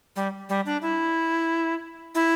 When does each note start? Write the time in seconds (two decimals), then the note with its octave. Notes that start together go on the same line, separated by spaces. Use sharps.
0.16 G3
0.49 G3
0.66 D4
0.82 E4
2.15 E4